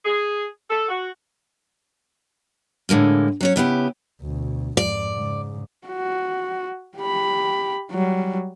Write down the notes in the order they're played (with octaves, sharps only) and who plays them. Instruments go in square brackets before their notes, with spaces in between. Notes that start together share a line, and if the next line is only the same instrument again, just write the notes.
[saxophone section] G#4
A4
F#4
[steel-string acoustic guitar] A2 D3 G#3 A#3
F#3 C#4 C#5
C#3 B3 E4 G4
[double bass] D2 B2
[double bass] F2 G#2 [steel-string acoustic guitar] D5
[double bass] G#2 C#3
[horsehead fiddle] F#4
G4 B5
F#3 G3